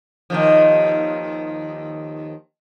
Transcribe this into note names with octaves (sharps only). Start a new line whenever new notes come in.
D#2 D#3 F3